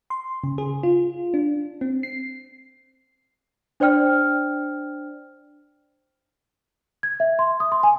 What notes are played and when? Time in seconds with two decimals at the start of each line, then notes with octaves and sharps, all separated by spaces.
0.10 C6
0.44 C#3
0.58 G#4
0.83 F4
1.34 D4
1.81 C4
2.03 C7
3.80 D4 C5 D5 G5 F6
7.03 G#6
7.20 E5
7.39 C6
7.60 D#6
7.72 C6
7.83 G#5